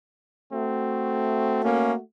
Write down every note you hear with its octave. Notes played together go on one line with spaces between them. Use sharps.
A3 C4 F#4
A#3 C#4